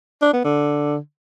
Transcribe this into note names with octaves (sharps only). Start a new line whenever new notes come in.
D4
B3
D3